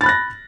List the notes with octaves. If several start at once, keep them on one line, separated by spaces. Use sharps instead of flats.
B5 F#6 A6 A#6